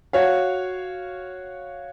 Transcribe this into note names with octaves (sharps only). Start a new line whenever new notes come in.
F#4 C#5 F5